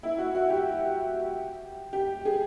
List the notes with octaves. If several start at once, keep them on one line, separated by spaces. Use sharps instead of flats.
E4
F#4
F#4
G4
G4
G#4